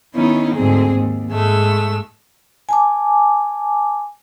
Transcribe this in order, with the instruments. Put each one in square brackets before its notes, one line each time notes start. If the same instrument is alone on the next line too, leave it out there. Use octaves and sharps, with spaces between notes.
[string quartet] D#3 B3 C#4 D#4 E4
D2 G#2 C4 G#4
D#2
G#2 G#3 A3 E6
[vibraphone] G#5 A5 D6